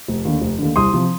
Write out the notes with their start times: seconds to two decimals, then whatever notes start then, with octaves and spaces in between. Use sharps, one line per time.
0.08 F1
0.25 D#2 D3
0.41 F1
0.59 D#2 D3
0.76 C2 C6 D#6
0.93 C3 F3